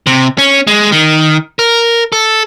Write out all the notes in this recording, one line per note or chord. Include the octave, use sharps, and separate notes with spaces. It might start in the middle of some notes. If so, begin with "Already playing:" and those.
C3
C#4
G#3
D#3
A#4
A4